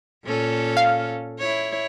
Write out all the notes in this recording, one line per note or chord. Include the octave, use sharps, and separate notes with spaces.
A#2 C#4 A4
F5
E4 C#5